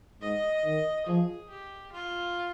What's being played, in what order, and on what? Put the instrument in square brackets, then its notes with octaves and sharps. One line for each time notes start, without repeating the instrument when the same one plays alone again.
[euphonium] G#2 [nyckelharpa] D#5
[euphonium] D#3
[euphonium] F3 [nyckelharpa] G#4
[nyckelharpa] G4
F4